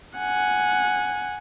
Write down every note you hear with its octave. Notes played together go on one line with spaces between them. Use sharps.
F#5 G#5